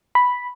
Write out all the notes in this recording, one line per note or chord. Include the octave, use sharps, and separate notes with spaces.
B5